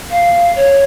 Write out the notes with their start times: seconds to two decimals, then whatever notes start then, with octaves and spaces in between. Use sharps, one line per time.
0.11 F5
0.55 C#5